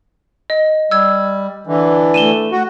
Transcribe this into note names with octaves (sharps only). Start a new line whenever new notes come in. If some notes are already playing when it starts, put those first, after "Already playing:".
D#5
G3 E6 G#6
D3 E3
A3 D#7 E7 G7
F#4